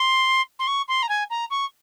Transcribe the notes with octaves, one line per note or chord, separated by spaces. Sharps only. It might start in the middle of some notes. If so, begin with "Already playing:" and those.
Already playing: C6
C6
C#6
C6
A#5
G#5
A#5
C#6